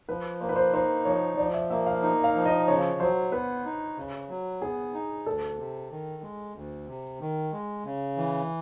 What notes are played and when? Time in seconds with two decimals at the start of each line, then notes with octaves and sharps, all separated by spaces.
0.09 F3 B4
0.41 A#3 C5
0.49 B4
0.56 C5
0.73 D#4 C5
1.05 F3 C#5
1.38 F3 D5
1.54 E5
1.70 A#3 E5
1.86 F5
2.02 D#4
2.24 F5
2.35 F3
2.46 D#5
2.68 C#3 C#5
3.00 F#3 C5
3.32 B3 B4
3.65 D#4
3.97 C#3
4.29 F#3
4.61 B3 G#4
4.94 D#4
5.26 D2 A4
5.58 C3
5.91 D#3
6.23 G#3
6.55 D2
6.88 C3
7.21 D#3
7.53 G#3
7.85 C#3
8.17 E3